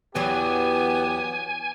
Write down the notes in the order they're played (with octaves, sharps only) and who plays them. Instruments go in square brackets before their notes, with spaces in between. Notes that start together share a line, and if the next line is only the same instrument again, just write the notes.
[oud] E2 E3 F#3 [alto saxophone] B3 [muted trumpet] G4 [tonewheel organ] G#5